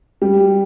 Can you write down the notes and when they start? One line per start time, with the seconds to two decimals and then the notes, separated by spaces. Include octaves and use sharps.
0.22 G3